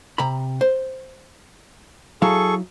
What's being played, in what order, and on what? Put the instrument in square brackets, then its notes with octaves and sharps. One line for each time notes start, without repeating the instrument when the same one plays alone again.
[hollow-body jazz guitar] C3 A#5 B5
C5
[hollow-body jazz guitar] F#3 E4 F5 [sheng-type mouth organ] G#4 A4 C#6